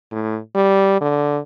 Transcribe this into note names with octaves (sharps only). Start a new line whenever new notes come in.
A2
G3
D3